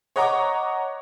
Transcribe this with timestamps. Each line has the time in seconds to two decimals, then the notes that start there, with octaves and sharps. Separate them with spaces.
0.16 C#5 D#5 F#5 A#5 C#6 D6